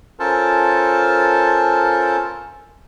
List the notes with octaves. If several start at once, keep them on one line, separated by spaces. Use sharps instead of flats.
C#4 F4 A4 A#4 C5 A5